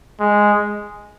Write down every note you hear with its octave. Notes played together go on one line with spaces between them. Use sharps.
G#3